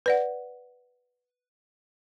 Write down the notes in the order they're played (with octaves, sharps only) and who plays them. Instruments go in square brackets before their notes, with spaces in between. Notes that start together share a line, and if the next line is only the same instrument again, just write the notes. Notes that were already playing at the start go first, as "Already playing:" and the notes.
[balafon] B4 D5 F#5